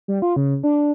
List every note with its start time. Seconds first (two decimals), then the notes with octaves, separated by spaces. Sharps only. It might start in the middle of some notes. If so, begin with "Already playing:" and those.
0.08 G3
0.22 F4
0.36 C#3
0.63 D4